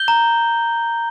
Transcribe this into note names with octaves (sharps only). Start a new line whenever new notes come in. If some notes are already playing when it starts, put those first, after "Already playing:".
Already playing: G6 G7
A#5